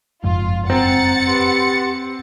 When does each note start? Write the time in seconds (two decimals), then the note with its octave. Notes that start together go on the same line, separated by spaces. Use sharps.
0.24 F#1 F2 G#2 F4
0.70 C4 F#5 A#5 A6 C#7
1.26 G4 B4 C6